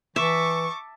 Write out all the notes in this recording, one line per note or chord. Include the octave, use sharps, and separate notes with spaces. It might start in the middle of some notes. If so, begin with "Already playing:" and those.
E3 E5 A5 C#6 D6